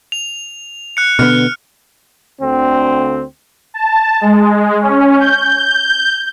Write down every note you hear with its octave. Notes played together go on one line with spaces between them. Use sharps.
F7
F#6 C#7
B2 D3 B3 F6
D2 D3 C4
A5
G#3
C#4
G6